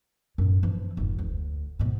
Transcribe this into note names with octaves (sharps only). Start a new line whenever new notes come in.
F#2 A2
E3 F3
F1 G#2
D2
G#2 B2